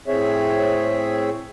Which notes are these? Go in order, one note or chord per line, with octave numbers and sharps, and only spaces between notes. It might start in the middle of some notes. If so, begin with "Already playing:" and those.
A2 C4 G#4 C#5 E5